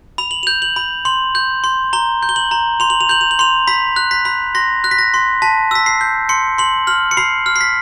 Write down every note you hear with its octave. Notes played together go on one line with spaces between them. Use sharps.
B5 F7
F#7
F7
G6
F#7
B5
C6 F#7
G6
C6
A#5 G7
G6
G7
F#7
A#5
C6 F7
F#7
F7
G6 F#7
F7
F#7
C6 F7
B5 B6
F#6
B6
B5
C6 A#6
F#6
B6
A#6
C6
A5 B6
E6 B6
C7
G6
C6 C#7
C6 F#7
F6 F#7
C#7
B5 C7
F6
C7
B6